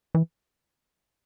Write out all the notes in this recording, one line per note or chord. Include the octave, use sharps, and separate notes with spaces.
E3